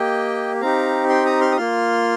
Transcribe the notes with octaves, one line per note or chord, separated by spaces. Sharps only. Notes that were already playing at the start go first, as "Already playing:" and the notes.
Already playing: A#3 G4 D#5 G5
C4 D#4 G4 F5 A#5
G5 C6
A#5 D#6
C6 F6
D#6
A#3 F4 C6 F6